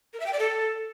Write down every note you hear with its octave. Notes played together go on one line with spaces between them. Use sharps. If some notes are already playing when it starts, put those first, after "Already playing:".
A#4
E5
G5
D5
A4